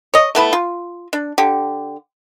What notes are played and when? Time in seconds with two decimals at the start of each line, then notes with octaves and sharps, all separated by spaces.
0.14 C#5 D#5
0.35 A3 B3 E4 B4
0.53 F4
1.13 D4
1.38 D3 G4